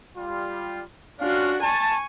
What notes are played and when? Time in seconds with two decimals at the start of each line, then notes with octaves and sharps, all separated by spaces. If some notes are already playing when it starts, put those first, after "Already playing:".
0.16 G3 F4
1.20 C#4 D4 F4 F#4 F5
1.62 G#5 A5 C#6